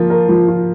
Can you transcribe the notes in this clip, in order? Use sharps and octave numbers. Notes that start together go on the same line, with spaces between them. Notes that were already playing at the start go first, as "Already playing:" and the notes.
Already playing: F3 A#3 F4
A#4
F3
F4